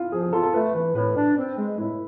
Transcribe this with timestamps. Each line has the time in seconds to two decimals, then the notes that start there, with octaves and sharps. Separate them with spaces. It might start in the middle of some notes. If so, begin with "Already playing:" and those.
Already playing: E4 F4
0.12 F3 G#4
0.23 G#4
0.33 F4 A4
0.43 A4
0.54 A3 B4
0.74 E3 B4
0.95 A2 B4
1.16 D4
1.37 C4
1.58 G#3
1.78 A2 E4